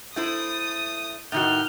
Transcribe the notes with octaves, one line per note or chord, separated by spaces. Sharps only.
A3 E4 C5 D#6
A2 D#3 D#4 F#4 F6 G6